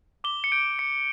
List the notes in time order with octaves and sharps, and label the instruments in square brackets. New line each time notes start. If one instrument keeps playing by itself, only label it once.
[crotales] D6 G7
C#7
G6 D7
D6 C#7